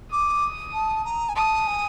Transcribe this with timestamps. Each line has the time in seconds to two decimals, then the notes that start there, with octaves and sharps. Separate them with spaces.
0.11 D6 D#6
0.73 A5
1.05 A#5
1.29 G#5
1.36 A5 D#6
1.67 G#5